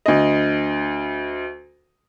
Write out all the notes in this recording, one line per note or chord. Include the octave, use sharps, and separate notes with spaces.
D2 D#5